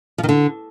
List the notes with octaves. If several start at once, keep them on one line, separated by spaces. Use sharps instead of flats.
F3
D#3
D3